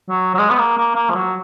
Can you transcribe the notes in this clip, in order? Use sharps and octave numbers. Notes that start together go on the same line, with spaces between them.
F#3
F#3
G#3
B3
A#3
A#3
A#3
F3
F#3